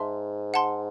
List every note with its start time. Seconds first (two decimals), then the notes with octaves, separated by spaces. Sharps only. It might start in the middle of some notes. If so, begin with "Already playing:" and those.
Already playing: G#2 E5 A5 C6
0.54 F#5 A5 C6